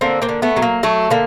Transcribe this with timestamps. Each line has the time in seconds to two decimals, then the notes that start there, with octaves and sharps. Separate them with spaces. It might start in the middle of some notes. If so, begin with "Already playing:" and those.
0.01 D3 A#3 C4
0.22 A#3 C4
0.29 D3
0.42 A3 B3
0.57 F#3
0.62 A#3
0.83 F#3 A3
1.10 D3 A#3